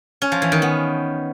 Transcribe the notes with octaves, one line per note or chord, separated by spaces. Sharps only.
C#4
F3
E3
D#3
B3